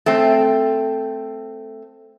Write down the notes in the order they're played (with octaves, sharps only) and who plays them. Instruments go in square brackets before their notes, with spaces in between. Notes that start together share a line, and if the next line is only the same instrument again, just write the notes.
[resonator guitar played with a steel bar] A3 C4